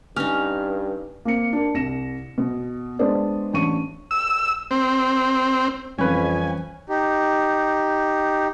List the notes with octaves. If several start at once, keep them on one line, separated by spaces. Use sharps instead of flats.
G2 C#4 D#4 F6
A#3 C4 C#7
D4 A#4
C2 A#6 E7
B2
G#3 B3 D4 B4 C5 D5
A1 D4 C#6 D#7
E6
C4
F2 E3 F3 G3 C#4 B4 G#5
D#4 G4